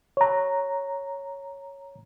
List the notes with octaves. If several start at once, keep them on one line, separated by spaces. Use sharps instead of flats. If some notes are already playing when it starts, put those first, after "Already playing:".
C#5 A#5